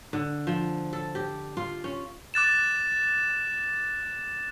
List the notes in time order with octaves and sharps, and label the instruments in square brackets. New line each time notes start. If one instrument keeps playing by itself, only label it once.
[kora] D3
F3
A4
G4
F4
C#4
[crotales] D6 F#6 A6 E7